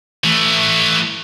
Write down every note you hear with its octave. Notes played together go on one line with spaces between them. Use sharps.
E3 A3